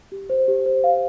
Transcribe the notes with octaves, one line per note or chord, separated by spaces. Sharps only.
G4
C5
G4
C5
G4 F5